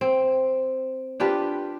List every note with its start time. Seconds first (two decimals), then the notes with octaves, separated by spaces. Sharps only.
0.01 C4
1.20 D4 F4 G4 B4